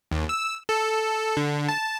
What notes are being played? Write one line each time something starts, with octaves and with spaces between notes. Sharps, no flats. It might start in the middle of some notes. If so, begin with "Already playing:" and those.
D#2
E6
A4
D3
A5